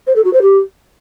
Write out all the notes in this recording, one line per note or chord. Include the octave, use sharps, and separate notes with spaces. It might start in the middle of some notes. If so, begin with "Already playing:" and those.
C5
A4
F#4
C5
G4